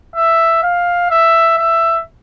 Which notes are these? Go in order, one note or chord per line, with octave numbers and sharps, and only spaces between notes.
E5
F5
E5
E5